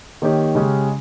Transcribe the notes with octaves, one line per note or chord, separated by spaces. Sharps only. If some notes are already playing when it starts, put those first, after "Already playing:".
D#3 A#3 D#4 G4 C#5
C#3 G#3 C#4 G4